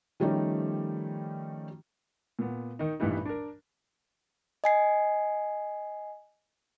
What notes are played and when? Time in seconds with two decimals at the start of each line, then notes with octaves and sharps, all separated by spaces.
0.20 D#3 F3 G3 A3 C#4 D#4
2.39 A#2 B3
2.79 D#3 D#4
3.00 A1 G2 A#2 E3 G3 D#4
3.25 D4 A#4
4.64 D#5 G#5 C7